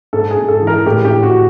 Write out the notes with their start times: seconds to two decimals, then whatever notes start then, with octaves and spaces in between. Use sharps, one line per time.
0.13 G#2 A4
0.30 G#4
0.37 G#2
0.48 A4
0.62 E3
0.67 A#4
0.86 A2 G4
1.05 G4
1.10 A2
1.23 F#4